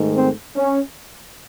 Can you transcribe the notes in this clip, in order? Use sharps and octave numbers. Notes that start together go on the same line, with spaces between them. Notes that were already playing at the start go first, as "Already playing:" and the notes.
Already playing: G#2 D#3 A3
C4
C#4